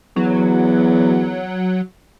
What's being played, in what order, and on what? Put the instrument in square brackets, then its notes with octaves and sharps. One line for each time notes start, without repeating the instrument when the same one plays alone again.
[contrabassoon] E2 [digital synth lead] F#3